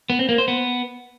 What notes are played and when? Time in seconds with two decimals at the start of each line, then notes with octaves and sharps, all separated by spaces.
0.10 B3
0.19 C4
0.29 A#3
0.38 C5
0.48 B3